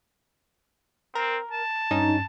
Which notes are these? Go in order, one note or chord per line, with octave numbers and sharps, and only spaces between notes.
C4 A#4
A5
G2 C#4 D#4 A6